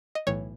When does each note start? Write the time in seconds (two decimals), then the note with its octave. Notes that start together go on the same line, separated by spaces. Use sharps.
0.15 D#5
0.27 B1 A2 E3 C#5